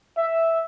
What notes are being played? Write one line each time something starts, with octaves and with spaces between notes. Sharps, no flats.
E5